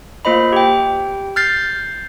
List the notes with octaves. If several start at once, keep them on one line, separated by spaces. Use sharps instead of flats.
A#3 F4 C5 D#5 B5
G4 G5
F6 G6 A6 C7